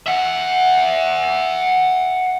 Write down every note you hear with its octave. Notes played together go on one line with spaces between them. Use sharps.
E5 F#5